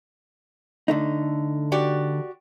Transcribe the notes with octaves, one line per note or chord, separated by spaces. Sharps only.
D3 A3 D#4
F#4 G4 D5